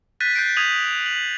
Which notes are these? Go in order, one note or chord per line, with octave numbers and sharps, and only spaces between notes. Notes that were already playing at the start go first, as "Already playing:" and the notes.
F#6 G6 A6 B6 D#7
G6 A6 C7 D7
D#6 G#6 D#7 F7 F#7
F#7